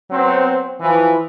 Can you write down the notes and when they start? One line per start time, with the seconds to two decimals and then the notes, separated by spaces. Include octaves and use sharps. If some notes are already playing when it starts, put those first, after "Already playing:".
0.11 F#3 B3 C4
0.80 E3 F3